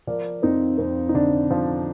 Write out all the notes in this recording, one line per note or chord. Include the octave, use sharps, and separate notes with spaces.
F3 A#4 D5
F2 C4 D#4
F2 C4
D#4
D3 D4
F3